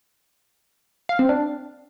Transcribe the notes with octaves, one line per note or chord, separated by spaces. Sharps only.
F5
C4
D4